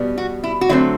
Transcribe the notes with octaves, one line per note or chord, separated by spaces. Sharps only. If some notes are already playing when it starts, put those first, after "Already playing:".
Already playing: B2 G3 B3
F#4
E4
F#4
D3 F#3 A3 C4 E4